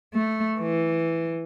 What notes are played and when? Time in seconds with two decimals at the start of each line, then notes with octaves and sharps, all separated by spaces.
0.14 A3
0.59 E3